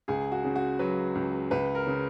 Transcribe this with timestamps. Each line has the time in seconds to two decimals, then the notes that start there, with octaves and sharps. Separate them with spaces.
0.08 C#2 G#4
0.32 F#4
0.44 C#3
0.56 F#4
0.79 F#3 B4
1.15 C#2
1.51 C#2 B4
1.75 A#4
1.86 C#3